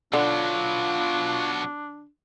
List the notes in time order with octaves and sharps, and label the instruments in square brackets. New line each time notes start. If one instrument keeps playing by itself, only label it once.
[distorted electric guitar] B2 F#3 [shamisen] D3 [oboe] D4 [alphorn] F4